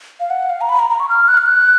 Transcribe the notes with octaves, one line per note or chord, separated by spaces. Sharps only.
F5
F#5
F5
A#5
B5
A#5
A#5
C#6
F6
F#6
F6
F#6